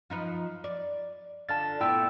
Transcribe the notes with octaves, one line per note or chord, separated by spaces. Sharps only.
F3 D#4 B4
D5
D3 D4 F4 A5 A6
A#2 A3 B3 E4 G5 E6